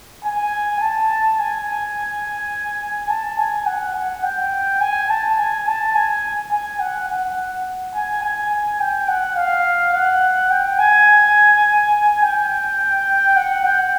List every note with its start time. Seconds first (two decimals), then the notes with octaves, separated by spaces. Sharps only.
0.24 G#5
0.81 A5
1.39 G#5
3.09 A5
3.37 G#5
3.66 F#5
3.95 F#5
4.23 G5
4.81 G#5
5.09 A5
5.38 G#5
5.67 A5
5.94 G#5
6.52 G#5
6.80 F#5
7.08 F#5
7.95 G#5
8.23 G#5
8.80 G5
9.08 F#5
9.37 F5
9.94 F#5
10.51 G5
10.79 G#5
12.22 G5
13.36 F#5
13.64 G5